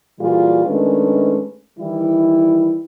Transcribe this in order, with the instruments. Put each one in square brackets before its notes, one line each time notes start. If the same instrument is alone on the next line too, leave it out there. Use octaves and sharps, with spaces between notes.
[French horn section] A#2 E3 G3 F4 F#4 G#4
D#3 G#3 A3 C#4 D4 B4
D#3 E3 G3 E4